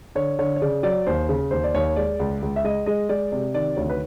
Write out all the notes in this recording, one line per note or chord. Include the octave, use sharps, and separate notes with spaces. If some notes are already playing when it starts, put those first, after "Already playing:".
D3 C#5
D3 C#5
C#5
C#3 D5
F#3 D5
D#2 C5
C#3
D#2 C5
D5
D#2 C#5
G#3 D5
C#2
C#2
E5
G#3 D#5
G#3 D#5
G#3 D5
C3 D5
D#3 D5
D2 C#5
B4